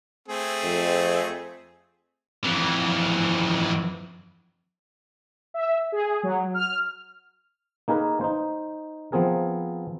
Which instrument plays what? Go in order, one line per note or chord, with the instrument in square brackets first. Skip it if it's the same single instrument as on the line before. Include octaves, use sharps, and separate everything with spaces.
[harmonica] A3 C4 G#4
[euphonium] F2
[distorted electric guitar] F2 E3
[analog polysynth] E5
G#4
F#3
F6
[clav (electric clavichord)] A#3 D#4 G#4 A#4 B4
D#4 C5
F3 B3 C4 G#4 A#4